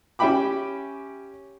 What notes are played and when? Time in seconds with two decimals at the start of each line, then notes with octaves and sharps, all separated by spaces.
0.19 C#4 G4 E5 G5 B5 D6